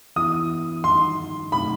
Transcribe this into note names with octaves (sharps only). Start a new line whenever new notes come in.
E3 B3 E4 D#6
D#3 G3 D#4 C6
B2 F#3 A3 C4 D#4 B5